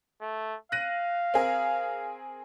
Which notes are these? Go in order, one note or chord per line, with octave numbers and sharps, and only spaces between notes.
A3
F5 F#6 A#6 D#7
C4 G#4 A#4